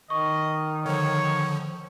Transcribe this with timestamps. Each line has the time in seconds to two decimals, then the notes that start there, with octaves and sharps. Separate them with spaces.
0.10 D#3 D#5 C#6
0.86 D3 F3 C#5